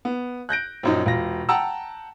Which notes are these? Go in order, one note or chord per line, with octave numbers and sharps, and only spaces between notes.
B3
F#6 G6 A#6 D7
A#1 F#2 D#4
E1 F4 A#6
F#5 G5 A5 A#5 E6